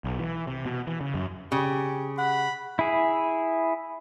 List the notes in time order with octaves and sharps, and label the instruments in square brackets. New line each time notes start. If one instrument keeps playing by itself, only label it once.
[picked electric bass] B1
E3
C3
B2
E3
C#3
F#2
[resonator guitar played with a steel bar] C#3 [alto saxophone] G4
[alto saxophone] F#5 [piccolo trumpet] B5
[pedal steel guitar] E4 G#4